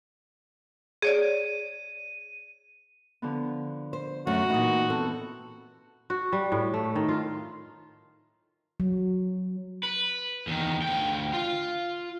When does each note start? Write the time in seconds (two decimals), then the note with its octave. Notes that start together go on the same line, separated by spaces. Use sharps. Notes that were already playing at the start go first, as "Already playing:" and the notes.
1.02 G#4 C#5 D5 D#7
3.22 D3 F3 B3
3.93 C5
4.27 F#2 A3 F#4
4.50 A#2 E3 D#4 F#5 D#6
4.90 B3 C4 A4
6.10 F#4
6.32 G3
6.52 A2
6.74 A3
6.95 D#3
7.09 F4
8.80 F#3
9.83 B4
10.47 E2 D#3
10.82 D2 G5
11.33 F4